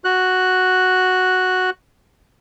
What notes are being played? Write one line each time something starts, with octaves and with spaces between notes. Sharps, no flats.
F#4 F#6